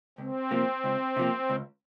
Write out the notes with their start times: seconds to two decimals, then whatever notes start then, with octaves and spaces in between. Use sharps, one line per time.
0.18 C#2 C4
0.51 C3 F3 A#3
0.84 C#2
1.17 C3 F3 A#3
1.50 C#2